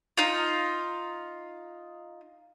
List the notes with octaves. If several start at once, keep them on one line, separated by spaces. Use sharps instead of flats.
D#4 F4